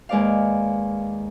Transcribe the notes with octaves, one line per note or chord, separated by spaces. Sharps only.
D#2 G#3 B4 D5 F5